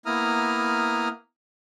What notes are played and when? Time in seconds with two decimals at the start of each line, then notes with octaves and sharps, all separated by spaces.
0.06 A#3 B3 E4 A#5 D#6 F6